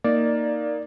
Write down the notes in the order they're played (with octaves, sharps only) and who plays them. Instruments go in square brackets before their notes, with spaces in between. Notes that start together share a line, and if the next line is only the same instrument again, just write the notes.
[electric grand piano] A#3 D#4 [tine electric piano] D5